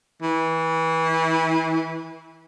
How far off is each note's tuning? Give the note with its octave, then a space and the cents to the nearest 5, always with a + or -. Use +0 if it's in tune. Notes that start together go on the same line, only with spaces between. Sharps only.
E3 -25